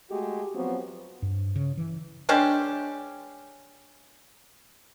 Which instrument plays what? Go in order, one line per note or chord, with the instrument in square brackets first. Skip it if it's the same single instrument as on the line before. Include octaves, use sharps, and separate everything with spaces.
[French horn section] G#3 A3 F#4 G4
F3 F#3 B3 C4 F#4
[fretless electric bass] G2
C#3
E3
[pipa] G#3 C#4 D4 G4